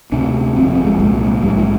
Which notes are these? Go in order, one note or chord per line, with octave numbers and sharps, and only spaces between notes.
D2 C3 D4
G1 F2 D3 C4
C4
G#3
C2 A#2 G#3
G#3
A#1 G#2 G3
F3